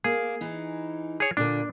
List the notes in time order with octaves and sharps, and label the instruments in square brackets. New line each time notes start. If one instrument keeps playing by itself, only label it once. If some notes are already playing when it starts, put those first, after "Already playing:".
[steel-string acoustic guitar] A#3 [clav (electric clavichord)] G#4
[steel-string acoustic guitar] E3 D#4
[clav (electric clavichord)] G#4 C#5
[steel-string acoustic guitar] A#2 D3 [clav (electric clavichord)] D4